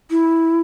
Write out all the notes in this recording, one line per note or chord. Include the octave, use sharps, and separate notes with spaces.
E4